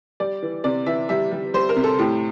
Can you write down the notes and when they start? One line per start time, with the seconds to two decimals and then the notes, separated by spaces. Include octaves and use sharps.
0.20 G3 D5
0.42 E3
0.64 C3 D5
0.86 E3 E5
1.09 G3 E5
1.32 G3
1.54 G3 C5
1.69 A#4
1.76 C3
1.84 A4
1.99 A2 G4